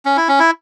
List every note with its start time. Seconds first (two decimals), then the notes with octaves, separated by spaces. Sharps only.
0.05 C#4
0.17 E4
0.28 C#4
0.39 E4